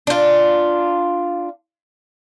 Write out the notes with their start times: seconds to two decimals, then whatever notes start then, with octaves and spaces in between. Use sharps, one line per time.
0.07 D4 F4